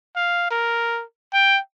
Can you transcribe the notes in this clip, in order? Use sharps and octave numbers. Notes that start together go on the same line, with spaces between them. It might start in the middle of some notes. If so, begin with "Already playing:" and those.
F5
A#4
G5